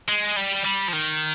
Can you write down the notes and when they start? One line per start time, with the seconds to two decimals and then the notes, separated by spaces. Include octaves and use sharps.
0.09 G#3
0.37 G3
0.64 G3
0.88 F3
0.93 D#3